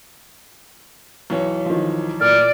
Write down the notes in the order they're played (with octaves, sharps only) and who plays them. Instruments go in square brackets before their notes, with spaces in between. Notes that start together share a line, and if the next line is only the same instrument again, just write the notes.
[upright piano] B1 E3 C#5
[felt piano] D#3 F3
[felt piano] A#2 [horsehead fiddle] D5 [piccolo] F6